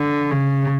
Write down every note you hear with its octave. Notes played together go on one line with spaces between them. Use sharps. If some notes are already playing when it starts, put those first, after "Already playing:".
Already playing: D3
C#3